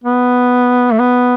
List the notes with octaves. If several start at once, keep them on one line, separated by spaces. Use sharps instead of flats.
B3
A3
B3